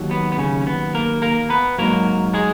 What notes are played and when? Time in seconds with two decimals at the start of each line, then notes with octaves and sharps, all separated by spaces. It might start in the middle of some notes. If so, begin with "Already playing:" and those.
Already playing: D#2 F#3
0.11 B3
0.32 B3
0.38 C#3 C#4
0.62 C#4
0.67 B3
0.95 A#3 A#4
1.22 A#3 A#4
1.50 B3 B4
1.78 G#2 F#3 A#3 A#4
2.34 G#3 G#4